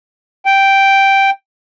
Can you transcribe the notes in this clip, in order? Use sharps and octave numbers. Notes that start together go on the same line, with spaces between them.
G5